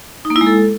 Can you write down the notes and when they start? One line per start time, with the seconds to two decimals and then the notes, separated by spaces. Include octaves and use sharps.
0.25 D#4
0.30 A#3
0.36 E4
0.41 G#3
0.46 A4